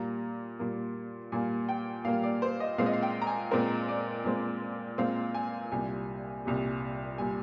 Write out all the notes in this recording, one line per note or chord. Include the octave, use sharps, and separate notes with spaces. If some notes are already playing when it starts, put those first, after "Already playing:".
Already playing: A#2 G3 A#3 A#5
A#2 G3 A#3
A#2 G3 A#3 G#5
G5
A#2 G3 A#3 F5
D5
C5
D#5
A#2 G#3 C4 F5
D#5
F5
G5
A#5
G#5
A#2 G#3 C4 A#4
D5
A#2 G#3 C4
A#2 G#3 C4 F5
G#5
C2 A#2 G3 G#5
C2 A#2 G3
A#2 G3 G#5